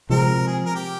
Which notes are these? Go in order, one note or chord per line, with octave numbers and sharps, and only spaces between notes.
C3 F3 G#3 C4 A#4
G#4
A#4
G4